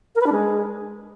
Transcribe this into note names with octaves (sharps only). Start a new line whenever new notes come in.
A#4
B4
D4
G#3